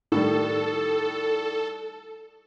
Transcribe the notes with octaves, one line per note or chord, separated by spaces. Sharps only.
A2 D#3 G3 A4